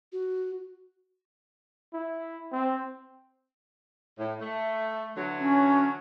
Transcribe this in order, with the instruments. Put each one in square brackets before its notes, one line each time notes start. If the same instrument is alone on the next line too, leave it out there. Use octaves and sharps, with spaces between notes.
[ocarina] F#4
[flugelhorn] E4
C4
[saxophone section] A2
A3
D3 E3 F#3
[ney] C#4